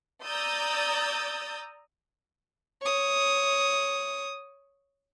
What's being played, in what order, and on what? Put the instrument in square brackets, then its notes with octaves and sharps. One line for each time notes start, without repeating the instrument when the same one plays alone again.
[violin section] D5 A#5 D#6 E6 G6 A6
[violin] C#5 D#6